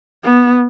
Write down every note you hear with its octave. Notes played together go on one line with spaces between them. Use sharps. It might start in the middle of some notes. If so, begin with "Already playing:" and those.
B3